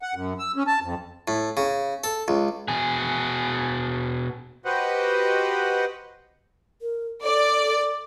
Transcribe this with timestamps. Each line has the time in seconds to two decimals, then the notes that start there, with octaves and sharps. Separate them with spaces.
0.02 F#5
0.15 F#2
0.39 E6
0.56 C#4
0.67 A5
0.82 F2
1.28 A2
1.57 C#3
2.04 A4
2.28 C#2
2.68 B2 G#4
4.65 F#4 G4 B4 C5 D#5 F#5
6.82 A#4
7.23 A4 D5